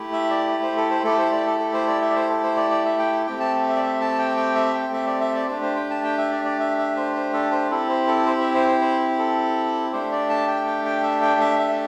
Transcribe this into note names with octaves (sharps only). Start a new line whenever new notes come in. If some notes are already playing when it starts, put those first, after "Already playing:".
Already playing: A3 E4 G4
E5
D5
C5
A4
C5
A3 E4 G4 A4
C5
D5
A4
A4
C5
D5
E5
D5
C5
A4
C5
D5
D5
E5
G5
A3 C4 G4 G5
A5
E5
D5
E5
A5
G5
G5
E5
G5
E5
D5
E5
D5
A3 D4 G4 C5
C5
G5
A5
G5
E5
D5
D5
E5
E5
C5
C5
A4
C5
C4 E4 G4 A4
C5
A4
C5
E5
C5
C5
C5
A4
A3 D4 G4 C5
D5
A5
G5
G5
G5
E5
G5
E5
E5